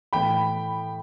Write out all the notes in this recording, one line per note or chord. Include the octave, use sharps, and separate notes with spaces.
A2 E3 A3 G5 B5